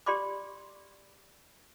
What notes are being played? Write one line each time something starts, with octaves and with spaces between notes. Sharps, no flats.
G4 D5 B5 C6 D6